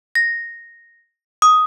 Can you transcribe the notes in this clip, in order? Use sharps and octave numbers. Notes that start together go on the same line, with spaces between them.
A#6
D#6